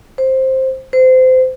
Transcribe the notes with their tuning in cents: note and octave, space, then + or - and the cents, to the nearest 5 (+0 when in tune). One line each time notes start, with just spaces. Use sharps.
C5 +10
C5 -25